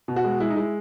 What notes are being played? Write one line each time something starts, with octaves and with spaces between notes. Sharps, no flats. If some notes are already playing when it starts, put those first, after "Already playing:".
B2
F#4
G#3
G#3 E4
D#4
G#3 E4